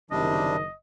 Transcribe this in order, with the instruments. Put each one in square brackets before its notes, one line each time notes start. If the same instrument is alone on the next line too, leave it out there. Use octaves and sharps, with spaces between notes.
[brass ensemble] F#1 D#3 [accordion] C3 G3 D4 [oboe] D#5